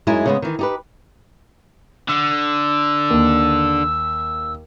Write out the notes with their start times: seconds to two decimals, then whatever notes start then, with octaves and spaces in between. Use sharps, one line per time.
0.07 F#2 G#3 D#4 E4 G#5
0.26 C#3 G#3 B3
0.42 D#3 E3
0.59 D#4 G4 B4
2.09 D3 E6
3.10 D#2